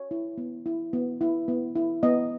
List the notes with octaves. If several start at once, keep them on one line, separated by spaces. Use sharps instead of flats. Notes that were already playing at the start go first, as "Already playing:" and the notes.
Already playing: C#5
E4
B3
E4
B3
E4
B3
E4
B3 D#5